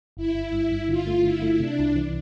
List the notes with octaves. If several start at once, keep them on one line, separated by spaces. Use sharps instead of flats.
G1 E4
G1
G2
G2
D3 F4
A3
D3 E4
A3
C3 D4
C2
E3